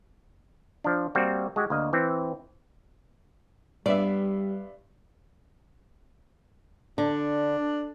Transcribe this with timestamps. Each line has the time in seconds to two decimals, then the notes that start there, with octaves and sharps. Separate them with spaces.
0.84 F3 D4
1.15 G3 A#3 C4 F#4
1.56 G#3 F#4 G4
1.70 D2 A#3 D#5
1.93 E3 C4
3.86 G2 G3 B3 D5 E5
6.98 D3 D4